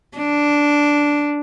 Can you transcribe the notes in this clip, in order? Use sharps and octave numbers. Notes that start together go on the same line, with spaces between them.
D4